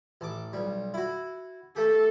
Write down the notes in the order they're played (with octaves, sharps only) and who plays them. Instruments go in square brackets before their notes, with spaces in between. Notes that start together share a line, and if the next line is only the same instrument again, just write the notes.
[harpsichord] A1 A5 D6
B1 G3
E4 F#4
[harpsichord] A3 G4 [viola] A4